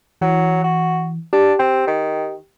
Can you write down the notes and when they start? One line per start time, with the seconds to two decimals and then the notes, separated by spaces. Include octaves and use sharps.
0.21 E3 F#3
0.64 F#4
1.33 D4 G4
1.59 C4
1.87 D#3